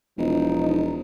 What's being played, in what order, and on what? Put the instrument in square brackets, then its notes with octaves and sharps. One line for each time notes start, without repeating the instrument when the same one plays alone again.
[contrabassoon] E1 [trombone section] F3 D#4